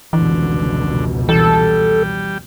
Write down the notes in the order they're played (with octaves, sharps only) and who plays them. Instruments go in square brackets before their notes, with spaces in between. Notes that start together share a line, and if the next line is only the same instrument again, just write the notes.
[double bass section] F1 C#2 B2 [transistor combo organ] D3 [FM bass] E3
[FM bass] E3 [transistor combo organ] G3 [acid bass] A4